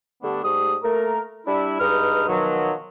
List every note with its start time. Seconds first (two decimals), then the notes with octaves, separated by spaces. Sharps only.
0.23 D3 G3 A3 B3 D4
0.44 G#2 G3 A3 D#6
0.84 A3 A#3 A#4
1.47 G3 D4 E4
1.80 G2 G#3 D#4 B4 F6
2.28 B2 D#3 F3 F#3